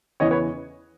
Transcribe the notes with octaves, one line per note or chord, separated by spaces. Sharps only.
E2 C#3 E3 C#5 D#5
B4 C#5